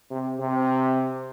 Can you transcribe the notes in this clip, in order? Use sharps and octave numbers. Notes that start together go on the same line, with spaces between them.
C3
C3